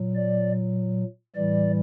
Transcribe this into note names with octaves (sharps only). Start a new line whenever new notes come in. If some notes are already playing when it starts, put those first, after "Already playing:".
Already playing: A#2 F#3
D5
A2 E3 G3 D5